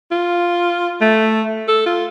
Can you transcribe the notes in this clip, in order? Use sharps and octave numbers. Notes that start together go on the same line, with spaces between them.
F4
A3
A4
F4